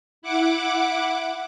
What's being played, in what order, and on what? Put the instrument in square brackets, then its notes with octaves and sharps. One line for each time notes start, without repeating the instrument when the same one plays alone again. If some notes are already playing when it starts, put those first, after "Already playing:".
[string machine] E4 F#5 D6